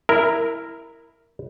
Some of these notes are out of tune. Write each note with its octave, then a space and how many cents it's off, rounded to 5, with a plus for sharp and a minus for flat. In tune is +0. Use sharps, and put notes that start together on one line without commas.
E4 +0 A#4 -5 E5 +15